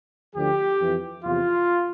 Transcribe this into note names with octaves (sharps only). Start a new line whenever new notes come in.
D2 D3 F3 G4
F2 E3
E2 C3 F3 F4